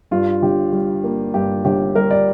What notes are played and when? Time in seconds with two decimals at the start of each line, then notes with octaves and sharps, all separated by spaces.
0.11 G2 F4
0.42 G1 G4
0.73 G3
1.04 A#3
1.34 G2 G4
1.65 G1 G4
1.95 G3 A#4
2.11 D5